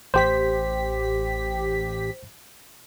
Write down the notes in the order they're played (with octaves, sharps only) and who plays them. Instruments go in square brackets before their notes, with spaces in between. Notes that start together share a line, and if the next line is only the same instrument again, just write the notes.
[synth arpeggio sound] A1 G4 B6 [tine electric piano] C5